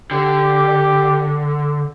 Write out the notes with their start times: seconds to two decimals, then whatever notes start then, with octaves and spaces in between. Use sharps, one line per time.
0.11 D3 G4